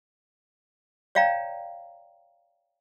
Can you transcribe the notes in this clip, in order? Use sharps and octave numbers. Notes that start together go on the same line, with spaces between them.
C#5 D5 F5 G5 A#5